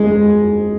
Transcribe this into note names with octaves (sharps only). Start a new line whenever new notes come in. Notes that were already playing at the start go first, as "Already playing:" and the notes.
Already playing: G#3